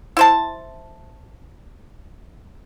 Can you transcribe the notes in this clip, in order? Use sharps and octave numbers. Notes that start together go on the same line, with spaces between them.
E4 C5 A5